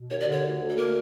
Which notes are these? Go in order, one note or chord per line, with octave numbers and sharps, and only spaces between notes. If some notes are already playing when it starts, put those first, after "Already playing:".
Already playing: B2
D#2 C#5
D5
D3 C#5
D2
D2
A4
A#3 A#4